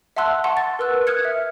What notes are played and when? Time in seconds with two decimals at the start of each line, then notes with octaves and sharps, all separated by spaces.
0.17 E5 F#5 A5 C6 E6 F#6
0.44 F#5 A5 C6 C#6
0.57 A6
0.79 A#4 B4 E6 F#6
1.07 D#6 F6 F#6 G#6 C#7
1.25 E5